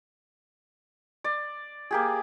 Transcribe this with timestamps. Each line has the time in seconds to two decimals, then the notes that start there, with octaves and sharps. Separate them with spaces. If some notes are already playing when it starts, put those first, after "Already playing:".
1.24 D5
1.91 A#3 G4 G#4